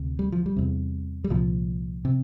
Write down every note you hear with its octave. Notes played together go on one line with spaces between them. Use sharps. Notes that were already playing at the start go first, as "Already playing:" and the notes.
Already playing: D2 C3
G3
F3
G3
E2 C3
G3
C2 A#2 F3
C3